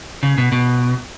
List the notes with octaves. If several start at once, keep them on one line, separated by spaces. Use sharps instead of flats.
C#3
B2
B2